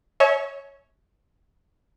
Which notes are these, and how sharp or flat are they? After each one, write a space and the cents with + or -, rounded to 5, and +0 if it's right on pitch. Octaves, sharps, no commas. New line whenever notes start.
C#5 +0 E5 -35 G#5 +40